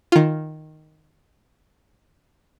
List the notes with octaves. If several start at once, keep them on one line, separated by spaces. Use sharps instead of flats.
D#3 F4